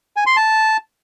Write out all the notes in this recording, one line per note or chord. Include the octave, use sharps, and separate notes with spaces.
G#5
C6
A5